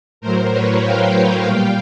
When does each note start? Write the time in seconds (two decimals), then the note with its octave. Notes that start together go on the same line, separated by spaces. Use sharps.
0.21 A2 F#3 A#4 C5
0.52 B4 C#5
0.83 F5 G5
1.45 A#2 G3